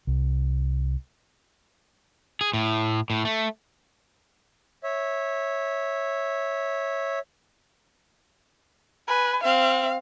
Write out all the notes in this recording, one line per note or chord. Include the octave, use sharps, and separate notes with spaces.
C2
G#4
A2
A2
A3
C#5 E5
B4 G#5
C4 F5